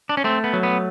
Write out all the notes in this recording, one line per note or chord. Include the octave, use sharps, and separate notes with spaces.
D4
C#4
A3 C4
B3
F#3
B3